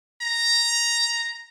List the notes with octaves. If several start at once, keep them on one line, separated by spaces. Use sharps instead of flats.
A#5